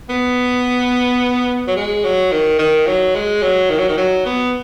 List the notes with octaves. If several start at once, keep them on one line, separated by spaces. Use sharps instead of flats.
B3
F#3
G#3
F#3
D#3
D#3
F#3
G#3
F#3
D#3
F#3
D#3
F#3
B3